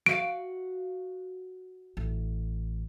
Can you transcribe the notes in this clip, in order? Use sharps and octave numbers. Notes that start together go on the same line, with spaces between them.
F#4 E5 F5 D7
A1